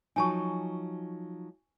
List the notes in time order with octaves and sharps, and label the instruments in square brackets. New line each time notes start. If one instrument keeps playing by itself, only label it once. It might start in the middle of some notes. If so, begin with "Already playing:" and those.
[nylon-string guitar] F3 F#3 D#4 [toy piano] G#5 A5 C#6